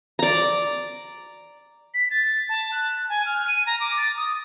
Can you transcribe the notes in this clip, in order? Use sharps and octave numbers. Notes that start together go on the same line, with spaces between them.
D5 A#5
B6
A6
A5
F#6
G#5
F6
D#7
A#5
D6
A6
D#6